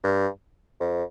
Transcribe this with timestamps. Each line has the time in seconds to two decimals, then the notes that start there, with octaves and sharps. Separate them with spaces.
0.04 G2
0.80 F2